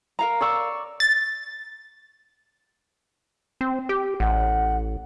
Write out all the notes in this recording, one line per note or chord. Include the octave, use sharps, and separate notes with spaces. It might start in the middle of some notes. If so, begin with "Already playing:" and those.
A#4 F5 A#5
D5 C#6 E6
A6
C4
G4
A1 F#5